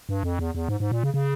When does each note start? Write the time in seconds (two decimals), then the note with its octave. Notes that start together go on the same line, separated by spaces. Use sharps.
0.09 G2
0.23 F2
0.39 E2
0.55 E2
0.68 G#2
0.80 G#2
0.92 A#2
1.03 C#3
1.14 C#3